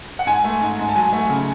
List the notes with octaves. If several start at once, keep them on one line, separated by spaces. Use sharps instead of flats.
F#5
G#2 G#5
A3
G#2
G#2
A5
F#3 G#5
A3
C#3